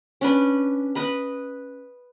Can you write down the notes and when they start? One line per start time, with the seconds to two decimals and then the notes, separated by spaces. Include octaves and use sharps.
0.21 C#4 D4 B4
0.95 B4 D#5 B5